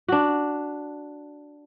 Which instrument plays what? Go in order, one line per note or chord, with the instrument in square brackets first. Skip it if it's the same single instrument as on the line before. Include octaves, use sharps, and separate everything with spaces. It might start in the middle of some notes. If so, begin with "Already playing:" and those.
[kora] D4 F#4